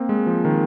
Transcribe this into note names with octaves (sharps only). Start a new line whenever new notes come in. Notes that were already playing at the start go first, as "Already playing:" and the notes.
Already playing: A#3 C4
G#3
F3
D#3